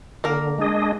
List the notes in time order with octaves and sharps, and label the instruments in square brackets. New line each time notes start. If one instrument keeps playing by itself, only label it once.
[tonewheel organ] D3 [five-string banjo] A#3 A#4
[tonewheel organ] G#3 D4 G#4 D#5